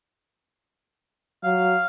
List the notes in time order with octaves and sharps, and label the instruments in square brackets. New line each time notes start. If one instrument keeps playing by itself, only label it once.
[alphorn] F#3 [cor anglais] F5